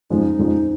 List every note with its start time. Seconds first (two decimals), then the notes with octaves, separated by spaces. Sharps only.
0.10 F2 C#3 F3 G#3 D#4
0.39 F2 C#3 F3 G#3